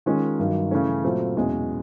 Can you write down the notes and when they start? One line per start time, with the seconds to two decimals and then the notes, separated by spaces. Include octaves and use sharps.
0.06 D#3 G#3 C#4 F4
0.39 G2 D#3 F#3
0.71 C#3 E3 A3 C#4
1.04 A#2 F#3 A3 C4
1.37 E2 B2 G#3 C#4